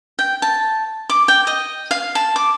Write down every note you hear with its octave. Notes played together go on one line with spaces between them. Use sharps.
G5
A5
D6
G5
D#5
F5
A5
D6